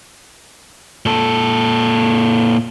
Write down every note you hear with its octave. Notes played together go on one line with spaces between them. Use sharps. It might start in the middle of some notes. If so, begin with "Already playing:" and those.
A#2 A4